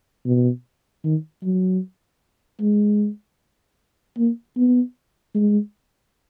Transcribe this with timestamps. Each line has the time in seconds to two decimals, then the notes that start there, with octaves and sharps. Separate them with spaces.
0.26 B2
1.04 D#3
1.43 F#3
2.61 G#3
4.17 A#3
4.57 B3
5.35 G#3